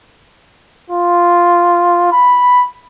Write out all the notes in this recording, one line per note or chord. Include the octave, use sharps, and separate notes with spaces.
F4
B5